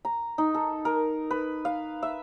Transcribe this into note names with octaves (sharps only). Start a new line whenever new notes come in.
A#5
D#4
A4
A#4
B4
F5
E5